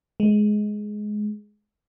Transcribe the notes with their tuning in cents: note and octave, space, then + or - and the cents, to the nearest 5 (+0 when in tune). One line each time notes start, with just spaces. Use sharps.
G#3 +15